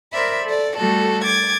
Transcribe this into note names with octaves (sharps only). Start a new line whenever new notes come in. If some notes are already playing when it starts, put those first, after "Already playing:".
A#4 C5 D5 E5 B5
A4 D5
G3 A3 F#4 A4
D6 G#6 A6